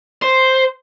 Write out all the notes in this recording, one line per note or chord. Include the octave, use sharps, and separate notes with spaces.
C5